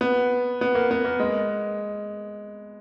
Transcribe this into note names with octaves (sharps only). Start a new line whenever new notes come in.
B3
B3
A#3
B3
A#3
G#3